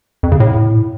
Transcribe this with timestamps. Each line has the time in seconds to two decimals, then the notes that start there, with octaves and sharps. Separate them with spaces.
0.23 F2
0.32 C#3
0.40 A2